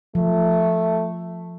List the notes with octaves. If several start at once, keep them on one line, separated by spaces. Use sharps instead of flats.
F3 A3